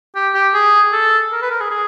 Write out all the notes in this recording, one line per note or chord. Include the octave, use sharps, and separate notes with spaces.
G4
G4
G#4
A4
A#4
B4
A#4
G#4
G#4